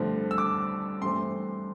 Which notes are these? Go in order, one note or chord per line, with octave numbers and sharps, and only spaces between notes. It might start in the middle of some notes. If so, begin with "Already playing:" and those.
Already playing: G2 D3 F3 A3 C4
E6
D6
G2 E3 A3 C4 C6